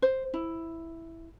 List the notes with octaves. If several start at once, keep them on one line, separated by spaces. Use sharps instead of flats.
C5
E4